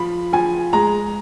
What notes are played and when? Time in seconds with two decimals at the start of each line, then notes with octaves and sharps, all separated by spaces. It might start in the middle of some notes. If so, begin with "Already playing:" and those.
Already playing: F3 B5
0.33 F3 G#5
0.73 G#3 A#5